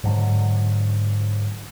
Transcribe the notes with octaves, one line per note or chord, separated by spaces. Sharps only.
G#2 D3 F#3